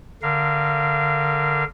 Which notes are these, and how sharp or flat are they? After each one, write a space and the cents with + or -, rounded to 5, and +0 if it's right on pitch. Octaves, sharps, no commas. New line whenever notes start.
D3 +0 A#4 +0 F5 -25